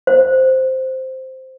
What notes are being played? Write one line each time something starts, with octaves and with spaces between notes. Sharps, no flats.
C5